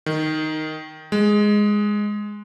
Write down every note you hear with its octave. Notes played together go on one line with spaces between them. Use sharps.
D#3
G#3